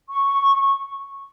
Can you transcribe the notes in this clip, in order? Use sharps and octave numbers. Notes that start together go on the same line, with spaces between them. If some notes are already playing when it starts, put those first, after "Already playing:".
C#6